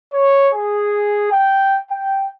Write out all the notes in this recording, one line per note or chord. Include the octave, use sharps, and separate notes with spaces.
C#5
G#4
G5
G5